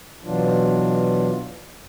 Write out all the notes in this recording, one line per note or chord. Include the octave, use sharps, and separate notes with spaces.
B2 E3 F#3 D4 F4